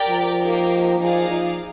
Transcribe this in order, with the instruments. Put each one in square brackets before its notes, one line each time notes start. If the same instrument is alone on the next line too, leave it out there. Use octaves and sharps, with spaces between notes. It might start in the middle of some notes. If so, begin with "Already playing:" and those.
Already playing: [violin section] G4 A#4 D5 G5
[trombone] F3
[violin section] A#3 D#4 G4 A#4
[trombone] F3 [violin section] D#4 G#4 D5 F5
[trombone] F3